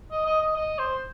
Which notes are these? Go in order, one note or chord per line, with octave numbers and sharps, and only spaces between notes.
D#5
D#5
D#5
D#5
C5